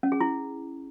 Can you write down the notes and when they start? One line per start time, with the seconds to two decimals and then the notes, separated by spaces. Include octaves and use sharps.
0.03 C#4
0.12 G#4
0.21 E4